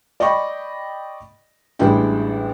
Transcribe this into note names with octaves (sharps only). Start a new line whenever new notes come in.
D5 D#5 G5 B5 C#6
A1 G3 G#3 D4 E4 G5